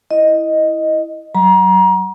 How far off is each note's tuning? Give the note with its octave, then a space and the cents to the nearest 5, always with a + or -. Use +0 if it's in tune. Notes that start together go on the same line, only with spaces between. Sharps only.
E4 -5 D#5 +0
F#3 +15 A#5 +30